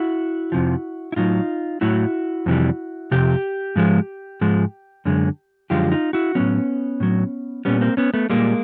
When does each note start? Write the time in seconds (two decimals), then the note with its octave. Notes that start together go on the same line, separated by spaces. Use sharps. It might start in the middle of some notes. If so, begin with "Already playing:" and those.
Already playing: E4 F#4
0.52 F2 C3 F3
1.12 E4
1.16 A2 F#3 D#4 F4
1.81 A2 F#3 E4 F#4
2.46 F2 C3 E3 G3
3.11 F2 C3 G4
3.76 G#2 F3 G#3
4.41 G#2 F3 G#3
5.05 F#2 D3 G#3
5.70 F#2 D3 F3 G#3 F4 G4
5.92 D#4 F4
6.13 E4 F#4
6.35 A2 F#3 B3 C#4
7.00 A2 F#3
7.65 A#2 G3 B3 C#4
7.81 A#3 C4
7.97 B3 C#4
8.14 A3 B3
8.30 A#2 G3 G#3 A#3